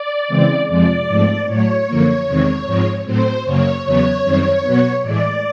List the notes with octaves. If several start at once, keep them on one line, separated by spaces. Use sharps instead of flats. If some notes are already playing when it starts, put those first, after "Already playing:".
Already playing: D5
C#3 E3 G#3 C4
F2 C3 F3 G#3 D5
G#2 F3 A3 C4
A2 F#3 A3 C#5
F#2 D3 F3 A#3
E2 C3 D#3 G#3 C4
G#2 F3 G#3 C4
A2 F#3 A3 C4 C5
F#2 C#3 F#3 A#3 C#5
E2 C#3 F#3 B3 C#5
F#2 D#3 G3 C4
B2 F#3 B3
A2 E3 G#3 D5